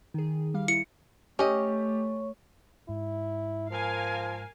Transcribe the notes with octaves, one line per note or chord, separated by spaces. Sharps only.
D#3 G#4
G3 F5
E4 C#7
A3 C#4 G4 C#5 D#5 C#6
G#2 E4
F3 A#4 F5 G#5